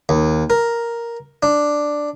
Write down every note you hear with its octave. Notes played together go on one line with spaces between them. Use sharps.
D#2
A#4
D4